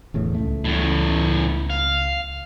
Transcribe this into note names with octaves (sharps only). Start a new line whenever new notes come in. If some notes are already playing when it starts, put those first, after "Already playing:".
D1 E2 A2
C#2 A3
E2 A2
F5